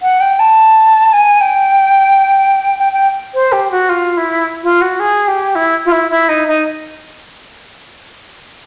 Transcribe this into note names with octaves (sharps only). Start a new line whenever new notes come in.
F#5
G5
A5
G#5
G5
G5
G5
C5
G4
F#4
F4
E4
F4
F#4
G#4
G4
E4
F4
E4
E4
D#4
D#4